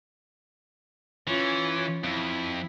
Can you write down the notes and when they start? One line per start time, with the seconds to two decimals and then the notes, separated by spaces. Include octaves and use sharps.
1.27 E3 C#4 F4
2.04 F2 E4